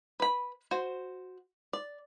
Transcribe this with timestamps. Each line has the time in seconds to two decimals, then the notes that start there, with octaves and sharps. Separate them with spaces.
0.20 B4 B5
0.71 F#4 C5
1.73 D5